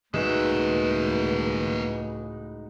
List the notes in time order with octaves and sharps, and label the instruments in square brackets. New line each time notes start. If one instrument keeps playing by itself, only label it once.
[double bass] C#2 A2 [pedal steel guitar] G#3 D#4 F#4 [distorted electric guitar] A#3 E5 [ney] B4